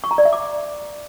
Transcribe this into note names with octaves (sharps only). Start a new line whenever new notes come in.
C#6
A#5
D5
E5
D6